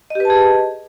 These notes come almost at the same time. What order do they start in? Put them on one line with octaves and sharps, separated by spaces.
D#5 G4 B4 A5 G#4